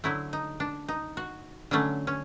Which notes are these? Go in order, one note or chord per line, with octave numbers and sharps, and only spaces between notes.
D3 F#3 A3 E4
D#4
D4
D#4
F#4
D3 F#3 A3 C#4
C#4